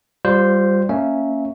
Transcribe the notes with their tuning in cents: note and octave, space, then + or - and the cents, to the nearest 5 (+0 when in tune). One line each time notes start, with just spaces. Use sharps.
G3 +0 F4 +20 C5 -5
A#3 -15 C#4 +0 E5 -20